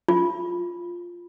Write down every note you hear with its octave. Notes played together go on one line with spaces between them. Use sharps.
F4